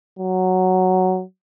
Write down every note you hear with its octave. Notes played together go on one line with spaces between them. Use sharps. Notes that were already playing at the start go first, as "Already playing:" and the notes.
F#3